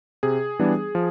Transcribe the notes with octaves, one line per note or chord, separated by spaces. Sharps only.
C3 G#4
E3 G3 B3 D4
F3